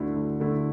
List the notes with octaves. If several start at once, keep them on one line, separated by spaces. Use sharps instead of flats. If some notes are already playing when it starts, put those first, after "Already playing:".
Already playing: D2 D3 A3 E4
D2
D3 A3 E4